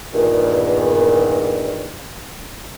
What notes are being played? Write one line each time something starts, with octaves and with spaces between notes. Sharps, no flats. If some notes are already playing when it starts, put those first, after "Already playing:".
E2 G2 A#2 D#3